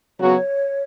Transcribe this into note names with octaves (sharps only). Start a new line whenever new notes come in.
C#3 F#3 B3 F#4 C#5